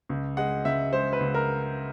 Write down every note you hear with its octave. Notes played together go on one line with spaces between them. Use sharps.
C#2
G#3 F#5
C#2 E5
G#3 C5
B4
C#2
A#4